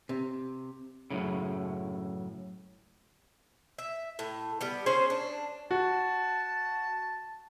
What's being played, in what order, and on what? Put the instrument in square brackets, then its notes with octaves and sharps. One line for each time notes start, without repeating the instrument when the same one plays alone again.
[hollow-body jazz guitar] C3
[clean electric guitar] F#2 A2 C#3
[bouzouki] E5
A2
G3 B3
C#4 G#4 C5
D4
[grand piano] F#4 [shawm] A5